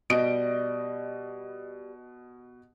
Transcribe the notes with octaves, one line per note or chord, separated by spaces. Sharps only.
B2 G3 D#5 D7